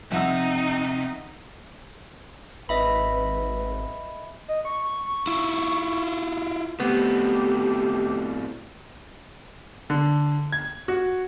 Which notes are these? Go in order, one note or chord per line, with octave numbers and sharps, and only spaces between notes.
F2 C3 F3 D#4 E5 F#5 E6
G#1 B4 D#5 E5 B5
D#5
C#6
E4 F4
A2 A3 B3 C4 G4
D3
G#6
F#4